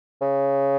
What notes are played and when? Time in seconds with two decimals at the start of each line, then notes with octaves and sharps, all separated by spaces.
0.21 C#3